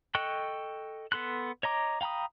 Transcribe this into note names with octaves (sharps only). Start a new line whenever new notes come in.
A4 D#5 G5 C#6 F#6
B3 A4 C6 F#6
C#5 D#5 A#5 D6
F5 G5 A#5 B5 D#6